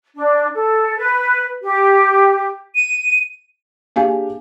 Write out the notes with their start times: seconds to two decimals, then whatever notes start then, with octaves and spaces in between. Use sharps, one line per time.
0.15 D4
0.54 A4
0.97 B4
1.62 G4
2.75 D#7
3.96 A#3 D4 G4 G#4 F5 G#5